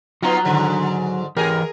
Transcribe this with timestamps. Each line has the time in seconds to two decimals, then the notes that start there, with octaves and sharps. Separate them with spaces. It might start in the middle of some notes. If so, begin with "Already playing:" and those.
0.22 F#3 B3 D#4 F4 F#5 A#5
0.45 G#2 D3 D#3
1.37 E3 G4 G#4 A#4